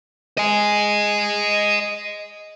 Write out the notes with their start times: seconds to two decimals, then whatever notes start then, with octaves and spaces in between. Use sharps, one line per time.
0.38 D#5 G#5